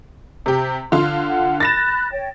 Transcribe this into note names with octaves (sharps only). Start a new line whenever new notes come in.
C3 G4
D3 F4 C6
F#5
B5 F#6 A6 A#6 E7
C#5 G5